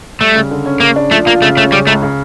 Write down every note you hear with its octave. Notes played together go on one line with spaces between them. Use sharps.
G3 A3
C#3
D3
C#4
C#3 A#3
D4
F3 A3
A#3 F4
C#3 A3
A3 C#4
C#3 G3
C#2 A3
C#3